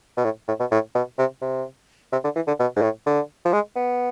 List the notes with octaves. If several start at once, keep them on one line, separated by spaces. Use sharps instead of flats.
B2
A2
A2
B2
A2
B2
C3
C3
C3
D3
E3
D3
B2
G#2
A2
D3
F3
G#3
B3